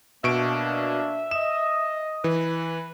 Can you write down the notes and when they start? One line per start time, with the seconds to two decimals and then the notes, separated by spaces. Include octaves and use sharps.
0.24 B2 A#3 D4 E5 C#6 D7
1.31 D#5 E7
2.24 E3 B4